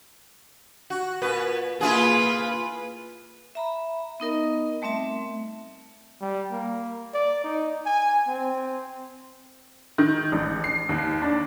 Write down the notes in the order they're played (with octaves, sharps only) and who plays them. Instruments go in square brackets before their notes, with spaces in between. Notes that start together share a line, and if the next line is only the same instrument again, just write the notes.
[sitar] F#4
A#2 B4
[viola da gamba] A#3 B4 [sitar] E4 F4 G#4
[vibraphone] E5 A#5 B5
B3 D#4 A#4 D#5
G3 A3 C4 E5 A5
[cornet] G3
A#3
D5
D#4
G#5
C4
[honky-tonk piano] D#3
A1
C7
D#2
D4